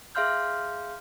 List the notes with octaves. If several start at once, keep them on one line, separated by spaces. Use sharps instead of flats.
G#4 E5 F5 C6 F6 G6